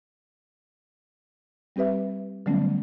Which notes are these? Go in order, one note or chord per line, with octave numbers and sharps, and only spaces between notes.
G3 C4 G4 B4 E5
D3 F#3 G3 A3 B3 C#4